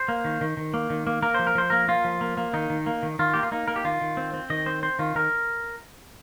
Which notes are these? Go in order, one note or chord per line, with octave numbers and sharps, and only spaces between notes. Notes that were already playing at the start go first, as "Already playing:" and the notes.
Already playing: C5
A#3
D#3
D#3
D#3
A#3
D#3
A#3
A#3 A#4
F3 C5
A#4
F3 C5
A#3 A#4
A#3 F4
F3
A#3
A#3
D#3 D#4
D#3
A#3
D#3
D#3 F4
A#3 G4
F4
A#3 D#4
A#3 A#4
G4
D#3 F4
D#3
C4
C4
D#3 D#5
C4 C5
C4 C5
D#3 F4
D#3 A#4